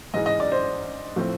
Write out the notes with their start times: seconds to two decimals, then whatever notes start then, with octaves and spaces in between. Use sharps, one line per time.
0.13 G#2 E3 G#3 D#5
0.26 D#5
0.40 D5
0.52 C5
1.16 A2 F3 A3 C4